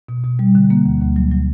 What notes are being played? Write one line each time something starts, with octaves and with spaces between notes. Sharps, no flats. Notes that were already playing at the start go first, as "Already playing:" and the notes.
B2
B2
G3
D3
A#3
D2
D2
F#3
F#3